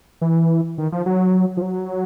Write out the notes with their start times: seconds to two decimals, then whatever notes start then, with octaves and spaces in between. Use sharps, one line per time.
0.21 E3
0.78 D#3
0.92 F3
1.06 F#3
1.57 F3
1.62 F#3